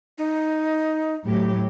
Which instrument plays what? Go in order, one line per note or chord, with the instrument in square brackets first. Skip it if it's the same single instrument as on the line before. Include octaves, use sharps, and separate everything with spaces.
[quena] D#4
[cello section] A2 F#3 G4